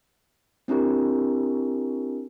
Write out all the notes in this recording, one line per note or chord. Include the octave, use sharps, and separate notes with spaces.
C4 D4 E4 G4 A#4